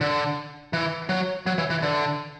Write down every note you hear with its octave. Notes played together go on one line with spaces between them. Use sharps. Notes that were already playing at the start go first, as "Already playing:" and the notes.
D3
E3
F#3
F#3
E3
E3
D3